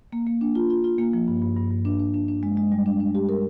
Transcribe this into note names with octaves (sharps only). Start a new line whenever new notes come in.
A#3
A#3
D4
F4
F4
F4
A#3
F3
G2
G2
G2
G2
D4
D4
D4
D4
G#3
G#3
G3
D4
D4
G4
A#4